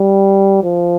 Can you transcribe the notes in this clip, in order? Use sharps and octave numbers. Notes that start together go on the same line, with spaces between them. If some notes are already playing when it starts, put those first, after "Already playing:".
Already playing: G3
F3